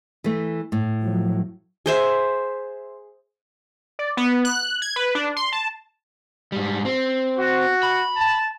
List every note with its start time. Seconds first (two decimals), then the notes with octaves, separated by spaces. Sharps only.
0.24 E3 A3
0.72 A2
1.01 F3 F#3
1.86 G#4 C5 E5
3.99 D5
4.17 B3
4.45 F#6
4.82 G#6
4.96 B4
5.15 D4
5.36 C6
5.52 A5
6.52 G#2 G3
6.85 C4
7.37 F#4
7.83 B5
8.16 A5